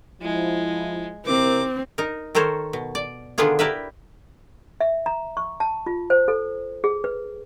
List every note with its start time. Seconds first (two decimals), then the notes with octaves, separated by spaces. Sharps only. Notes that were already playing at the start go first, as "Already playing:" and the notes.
0.22 F3 G#3 E4
1.26 C3 C4 E4 A#4 D6
1.98 D#4 A#4
2.35 D#3 A4 A#4 C5 C#5
2.73 B2
2.95 D5
3.38 D3 D#3 B3 D4 F4 G#4
3.59 E4 G4 A#4 B4 E5
4.81 E5
5.06 A#5
5.37 C#6
5.60 A5
5.86 F4
6.10 C5
6.28 A4
6.84 G#4
7.04 B4